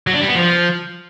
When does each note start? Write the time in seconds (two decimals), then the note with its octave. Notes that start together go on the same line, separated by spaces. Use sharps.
0.07 F#3
0.14 D4
0.21 G3
0.28 B3
0.35 F3